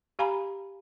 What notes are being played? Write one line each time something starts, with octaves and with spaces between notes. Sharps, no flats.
G4 F5 G#5 A#5 B5